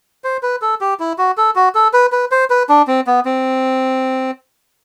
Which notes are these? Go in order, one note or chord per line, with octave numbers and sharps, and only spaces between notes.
C5
B4
A4
G4
E4
F#4
A4
F#4
A4
B4
B4
C5
B4
D4
C4
B3
C4